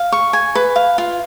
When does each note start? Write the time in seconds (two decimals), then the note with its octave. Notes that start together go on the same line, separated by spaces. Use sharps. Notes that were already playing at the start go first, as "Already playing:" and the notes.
Already playing: F5
0.12 C#6
0.33 G#5
0.55 B4
0.76 F5
0.98 F4